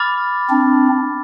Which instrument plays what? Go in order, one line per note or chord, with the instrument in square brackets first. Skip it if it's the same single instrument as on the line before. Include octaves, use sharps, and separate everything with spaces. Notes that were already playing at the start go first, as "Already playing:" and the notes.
Already playing: [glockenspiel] B5 D6 F6 A6
[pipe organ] C4 D4